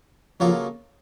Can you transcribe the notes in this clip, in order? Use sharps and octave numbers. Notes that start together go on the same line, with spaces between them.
C#3 F3 F#3 A#3 F4 A4